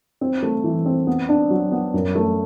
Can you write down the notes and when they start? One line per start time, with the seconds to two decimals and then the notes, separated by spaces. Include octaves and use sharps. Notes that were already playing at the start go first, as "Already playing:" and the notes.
0.21 C4
0.42 A3
0.64 E3
0.86 C4
1.07 B3
1.29 D4
1.50 F#3
1.72 B3
1.94 F#2
2.15 A3